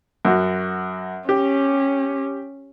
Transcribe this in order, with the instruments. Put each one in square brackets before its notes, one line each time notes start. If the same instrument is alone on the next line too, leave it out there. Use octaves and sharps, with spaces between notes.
[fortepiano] F#2 F#4
[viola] C#4 [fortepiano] G4